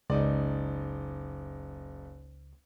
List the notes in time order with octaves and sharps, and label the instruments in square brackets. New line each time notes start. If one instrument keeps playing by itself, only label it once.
[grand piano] F#1 D#4 D5 [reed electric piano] C#2